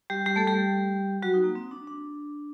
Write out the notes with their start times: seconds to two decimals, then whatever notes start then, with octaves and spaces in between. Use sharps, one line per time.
0.10 G3 G4
0.26 G3 G4
0.36 A3 A4
0.47 G3 G4
1.22 F#3 F#4
1.34 D#4
1.44 A#3
1.55 C4
1.71 D4
1.87 D4